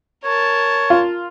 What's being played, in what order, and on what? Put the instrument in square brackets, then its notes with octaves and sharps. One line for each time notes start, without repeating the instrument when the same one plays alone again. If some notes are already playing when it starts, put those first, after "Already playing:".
[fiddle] A#4 A5 [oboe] C#5
[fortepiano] F4